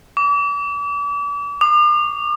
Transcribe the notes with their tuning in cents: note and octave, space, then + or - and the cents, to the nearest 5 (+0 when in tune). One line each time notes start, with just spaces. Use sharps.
D6 -40
D6 +45